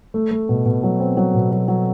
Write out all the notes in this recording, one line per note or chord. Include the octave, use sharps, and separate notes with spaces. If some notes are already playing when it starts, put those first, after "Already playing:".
A3
A3
B2
B2
F#3
C4
F#3
B2
F#3
F#3